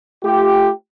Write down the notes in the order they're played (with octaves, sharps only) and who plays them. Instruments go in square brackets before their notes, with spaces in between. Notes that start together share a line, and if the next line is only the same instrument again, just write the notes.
[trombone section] A3 F4 G4